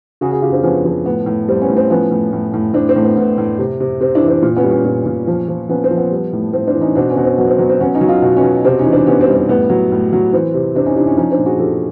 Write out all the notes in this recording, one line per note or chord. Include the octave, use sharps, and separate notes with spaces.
C#3 F#4 G#4
F#4 G#4
C#3 F4 G4
C4 D4
F3 B3 C#4
F3 C4
A2 B3
A2
G3 C4
B3 C#4
A2
C4
F3 B3 C#4
A2
A2
A2
A2 C4 D4
C4
A2
B3
A2 B3
A2
C3
C3
C3 C4
D4 E4
E3
C4 D4
A#2
B3 C#4
G3
B3 C#4
A#2
A#2
F3
F3
F3 B3 C#4
C4
F3
B3
G3
A2
A2 C4
C4 D4
E3
C#4 D#4
B2 C4 D4
B3 C#4
B2
C4
F#3 B3
C4
F#3 B3
C4
F#3 B3 C#4
C#4 D#4
F#3
D#4 F4
B2
B3 C#4
B2
C3 C4
C#4 D#4
E3
C4 D4
C3 B3 C#4
C4
G3
C4
A2 B3
F#3
A2
F#3
E3 C4
C3
C3 C4 D4
C#4 D#4
C3 D4 E4
C#4 D#4
F3 C#4 D#4
C4 D4
A#2
F#4 G#4
F3 G4 A4